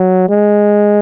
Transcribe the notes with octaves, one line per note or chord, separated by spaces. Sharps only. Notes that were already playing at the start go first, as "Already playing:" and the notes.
Already playing: F#3
G#3